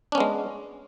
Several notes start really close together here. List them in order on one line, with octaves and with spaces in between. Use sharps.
D4 C#4 B3 G#3